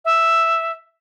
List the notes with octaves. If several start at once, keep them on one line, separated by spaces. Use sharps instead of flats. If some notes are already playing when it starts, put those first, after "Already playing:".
E5